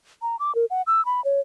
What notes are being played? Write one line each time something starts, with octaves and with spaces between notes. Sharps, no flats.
A#5
D6
A#4
F#5
E6
B5
C#5